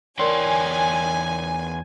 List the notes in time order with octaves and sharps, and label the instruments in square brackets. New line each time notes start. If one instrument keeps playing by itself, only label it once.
[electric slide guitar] E2 C#5 G5 [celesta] A#4 D5 C6 [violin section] G#5